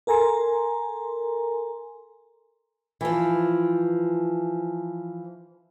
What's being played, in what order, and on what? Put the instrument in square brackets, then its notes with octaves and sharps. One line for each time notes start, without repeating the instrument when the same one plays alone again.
[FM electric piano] A4 A#4 G#5 A#5 C6
[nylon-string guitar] E3 F3